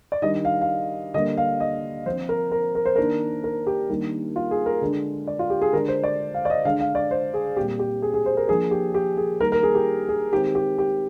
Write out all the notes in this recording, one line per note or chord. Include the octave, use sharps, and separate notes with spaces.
D5
D#3 G3 D4 D#5
F5
F5
D3 G3 A#3 D4 D#5
F5
D#5
F3 C4 C5
A#4
A#4
A#4
C5
D#3 A#3 D4 A#4
A#4
G4
D#3 G3 A#3 D4
F4
G#4
A#4
D3 G#3 D4
D5
F4
G4
G#4
D3 G#3 D4 A#4
C5
D5
F5
D5
D#5
D3 G#3 D4 F5
F5
D5
C5
G#4
A#2 G3 C4 G4
G4
G#4
G#4
C5
A#4
F3 A#3 D4 G#4
G4
G4
G#4
D#3 G3 A#3 A#4
A#4
G#4
G4
G#4
D#3 G#3 C4 G4
G4
G4